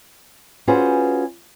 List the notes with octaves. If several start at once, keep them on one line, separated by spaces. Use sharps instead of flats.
C#4 F4 F#4 G#4 B4 C5